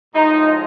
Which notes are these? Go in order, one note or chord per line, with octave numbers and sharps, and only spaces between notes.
A2 F3 G#3 D#4